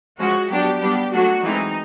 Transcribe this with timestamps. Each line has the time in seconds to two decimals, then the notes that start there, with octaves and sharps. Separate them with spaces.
0.19 F3 G#3 C#4 F#4
0.50 F#3 B3 D4 G4
0.81 G3 B3 D4
1.13 F#3 A3 D4 F#4
1.43 E3 G#3 C4 D#4